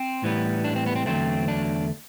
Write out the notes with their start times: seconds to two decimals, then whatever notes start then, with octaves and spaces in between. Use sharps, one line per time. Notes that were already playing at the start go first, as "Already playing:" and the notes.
Already playing: C4
0.23 A2 E3 G3 B3
0.64 D4
0.76 C4
0.86 B3
0.96 C4
1.06 E2 D3 F#3 A3 C4
1.48 D4